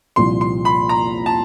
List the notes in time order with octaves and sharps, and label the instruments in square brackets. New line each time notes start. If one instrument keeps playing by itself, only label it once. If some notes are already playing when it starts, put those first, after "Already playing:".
[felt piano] C2 A#2 F3 [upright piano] C6
[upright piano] C6
B5
A#5
A5